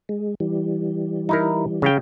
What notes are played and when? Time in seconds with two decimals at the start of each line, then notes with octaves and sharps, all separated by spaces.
0.09 G#3
0.40 E3 G3
1.29 D#4 E4 A#4
1.82 C#3 F5 G5